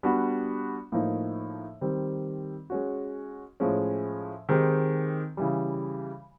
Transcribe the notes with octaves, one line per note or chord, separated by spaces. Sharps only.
G3 B3 D4 F#4
A2 F3 A#3 D#4
D#3 G3 C4
G#3 C#4 F#4
A2 F3 G#3 C#4
D#3 G#3 C4 D#4 G4
C#3 E3 G3